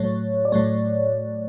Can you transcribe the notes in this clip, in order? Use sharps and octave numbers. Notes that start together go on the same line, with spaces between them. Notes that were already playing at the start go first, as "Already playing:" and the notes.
Already playing: A2 F#3 A3 C#5
D5
A2 F#3 A3 C#5